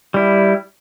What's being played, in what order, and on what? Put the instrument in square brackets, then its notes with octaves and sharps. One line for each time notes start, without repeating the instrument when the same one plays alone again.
[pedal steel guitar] G3 E4